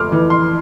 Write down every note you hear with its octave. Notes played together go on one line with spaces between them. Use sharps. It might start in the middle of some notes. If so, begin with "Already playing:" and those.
Already playing: F2 A3 C6 D6 F6
E3
C6